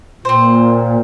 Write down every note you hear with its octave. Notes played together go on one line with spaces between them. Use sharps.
A#2 C4 C5